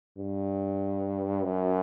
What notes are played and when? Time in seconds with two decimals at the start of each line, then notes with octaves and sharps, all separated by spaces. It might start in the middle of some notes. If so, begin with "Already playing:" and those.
0.18 G2
1.43 F#2